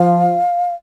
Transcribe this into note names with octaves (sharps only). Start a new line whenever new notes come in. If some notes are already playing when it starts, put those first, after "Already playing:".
Already playing: F3 F5